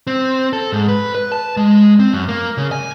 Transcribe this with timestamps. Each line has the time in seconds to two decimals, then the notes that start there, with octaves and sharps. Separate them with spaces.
0.07 C4
0.53 A4
0.73 G#2
0.89 B4
1.15 B4
1.32 A5
1.57 G#3
1.99 C4
2.14 F#2
2.28 A#3
2.57 C#3
2.72 G#5